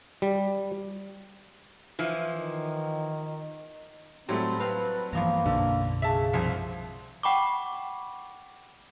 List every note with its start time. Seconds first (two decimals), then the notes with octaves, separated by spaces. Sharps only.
0.22 G3
1.99 E3 F3
2.34 D#3
4.29 A2 F#3 G3 A3 C4
4.59 C4 B4 F5 A#5
5.13 G2 E3 F3 A#3 B3 A#5
5.46 B1 F#2 B2 D3
6.02 C#3 E5 A5
6.33 C2 F3 F#5 G#5
7.23 F#5 G5 B5 C#6 D6